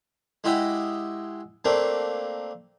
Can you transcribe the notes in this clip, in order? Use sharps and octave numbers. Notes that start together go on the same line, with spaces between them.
G#3 E4 F#4 G4 D#5 E5
A3 A#3 C4 D4